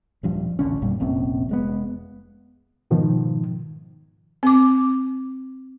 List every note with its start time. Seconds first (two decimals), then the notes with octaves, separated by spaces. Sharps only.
0.23 D#1 G2 F3
0.59 D#1 A1 D3 C#4
0.82 G1 F2 A#2 G3
1.00 F1 A#1 C4 C#4
1.49 F1 G#3 B3
2.90 G#2 B2 D#3 F3
4.43 C4 D6